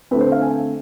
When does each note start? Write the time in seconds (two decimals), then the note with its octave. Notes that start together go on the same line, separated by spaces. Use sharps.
0.11 D3 A3 C4 B4
0.21 C5
0.32 F5
0.42 G#5